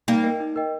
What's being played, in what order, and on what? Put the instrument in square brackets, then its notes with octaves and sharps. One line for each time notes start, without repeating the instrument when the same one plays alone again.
[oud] G3 A#3 [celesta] D#4
[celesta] A#4 D#5 G5
D#4
A#4 D#5 G5